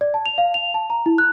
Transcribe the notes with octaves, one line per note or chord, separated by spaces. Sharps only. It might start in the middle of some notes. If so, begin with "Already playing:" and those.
D5
A5
F7
F5
F7
A5
A#5
E4
F#6